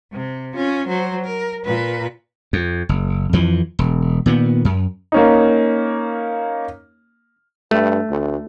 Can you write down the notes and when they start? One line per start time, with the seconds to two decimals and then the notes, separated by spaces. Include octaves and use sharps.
0.12 C3
0.55 C#4 F4
0.87 F#3 C5
1.25 A#4
1.65 A#2 B4
2.53 F2
2.89 F#1
3.33 F2 E3 F3
3.79 E1
4.26 A#2 D#3 B3
4.65 F#2
5.12 A#3 C#4 D#4
7.71 G2 A3
8.10 D2